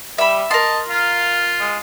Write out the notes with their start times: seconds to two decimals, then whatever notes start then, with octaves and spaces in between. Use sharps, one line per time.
0.18 G3 E5 B5
0.51 A#4 D#5 A5 C6
0.89 F4 F5
1.60 G#3